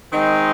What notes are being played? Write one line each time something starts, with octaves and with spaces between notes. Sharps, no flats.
D#3 G#3 C4 D#4